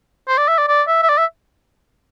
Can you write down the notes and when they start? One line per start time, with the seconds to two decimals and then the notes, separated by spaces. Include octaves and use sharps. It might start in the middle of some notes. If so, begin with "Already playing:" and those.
0.28 C5
0.38 D5
0.48 E5
0.58 D5
0.69 D5
0.88 E5
1.03 E5
1.09 D5
1.18 E5